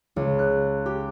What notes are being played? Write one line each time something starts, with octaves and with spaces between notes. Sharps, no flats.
C#2
F#6
G4